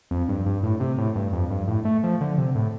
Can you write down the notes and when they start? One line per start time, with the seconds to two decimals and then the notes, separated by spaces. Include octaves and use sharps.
0.11 F2
0.28 G2
0.46 G2
0.63 A2
0.80 C3
0.98 A2
1.15 G2
1.33 F2
1.51 G2
1.68 A2
1.85 A3
2.03 F3
2.21 D3
2.38 C3
2.55 A2